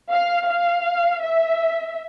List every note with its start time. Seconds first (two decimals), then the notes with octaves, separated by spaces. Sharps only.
0.10 F5
0.47 F5
1.20 E5